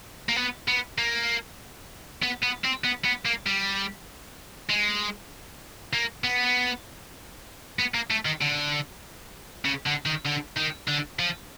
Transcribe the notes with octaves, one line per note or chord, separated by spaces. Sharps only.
A#3
B3
B3
A#3
B3
B3
C4
B3
B3
A#3
G3
G#3
A#3
B3
B3
A#3
A3
D#3
D3
C#3
D3
D#3
D3
D#3
D3
F3